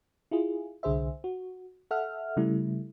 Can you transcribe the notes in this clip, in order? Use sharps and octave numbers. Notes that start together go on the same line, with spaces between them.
E4 F4 G#4
C2 D3 G#4 C5 E5
F#4
A4 E5 F#5 F6
C#3 G3 A3 E4